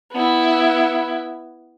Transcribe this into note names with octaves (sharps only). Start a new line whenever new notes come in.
B3 E4